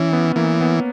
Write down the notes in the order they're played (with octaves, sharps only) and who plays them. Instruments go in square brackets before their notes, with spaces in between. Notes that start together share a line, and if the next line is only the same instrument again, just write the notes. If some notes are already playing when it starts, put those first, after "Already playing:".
Already playing: [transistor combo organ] E3 [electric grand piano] C#4
[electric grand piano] B3
[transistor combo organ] E3 [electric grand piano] A#3
[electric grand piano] B3